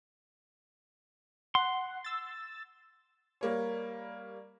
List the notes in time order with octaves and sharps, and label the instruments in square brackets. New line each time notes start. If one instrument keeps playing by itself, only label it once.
[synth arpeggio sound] F#5 [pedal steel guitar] C6
[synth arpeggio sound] E6 A6
[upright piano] G3 A#3 C#5